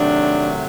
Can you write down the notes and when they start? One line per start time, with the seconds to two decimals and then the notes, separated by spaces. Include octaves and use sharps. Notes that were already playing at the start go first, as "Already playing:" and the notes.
Already playing: C3 D#3 F#3 A3 D4